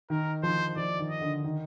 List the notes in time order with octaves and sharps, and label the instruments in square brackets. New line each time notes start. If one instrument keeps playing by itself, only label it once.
[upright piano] D#3 [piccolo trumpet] A#4
[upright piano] F3 [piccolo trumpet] C5
[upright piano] F3 [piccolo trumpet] D5
[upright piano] D#3
[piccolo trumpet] D#5
[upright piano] D3
D#3